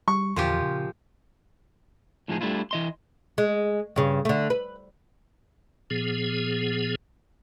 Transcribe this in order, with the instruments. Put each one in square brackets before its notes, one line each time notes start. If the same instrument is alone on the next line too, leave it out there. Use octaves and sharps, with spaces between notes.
[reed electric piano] G3 [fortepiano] C#6
[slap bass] E2 D3 [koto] A#2 F3 G4 [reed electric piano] C6
[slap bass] C#3
[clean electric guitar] A2 F3 G#3 D#4 E4 G#4
G3 A3 D4 E4 F4
E3 D#5 C6
[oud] G#3
G2 C#3
D3 A3
B4
[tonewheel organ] A#2 F3 B3 G#4